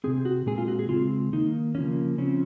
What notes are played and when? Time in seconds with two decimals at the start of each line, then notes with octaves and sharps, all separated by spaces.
0.04 C3 F3 C4 G#4
0.25 F#4
0.46 A#2 G#3 C4 G#4
0.58 F4
0.68 F#4
0.79 G#4
0.89 C#3 G#3 C4 F4
1.33 D#3 A#3 D#4
1.75 C#3 F3 A#3 C#4
2.18 C#3 F3 C4 C#4